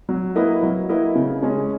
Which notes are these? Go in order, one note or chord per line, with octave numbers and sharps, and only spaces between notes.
F#3
A#3 E4 B4 D#5
F#3
A#3 E4 B4 D#5
C#3
G#3 C#4